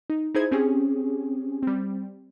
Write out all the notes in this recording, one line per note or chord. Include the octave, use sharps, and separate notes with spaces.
D#4
D#4 E4 G#4 C5 G#6
C4 C#4 G4 G#4
G3 C4